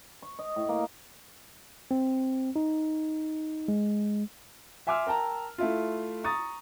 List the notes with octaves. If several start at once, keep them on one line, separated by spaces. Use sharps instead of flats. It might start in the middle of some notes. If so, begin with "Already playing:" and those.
C#6
D#5
A2
A#3
C4
D#4
G#3
E5 G#5 C6 D6 E6 F6
A#4 G5 A5 A#5
A3 E4 F4
A#5 C#6 D#6 A6